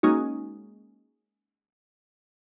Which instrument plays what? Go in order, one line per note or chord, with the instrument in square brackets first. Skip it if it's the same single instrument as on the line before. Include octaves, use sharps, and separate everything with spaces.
[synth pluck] G#3 A#3 C#4 D#4 F#4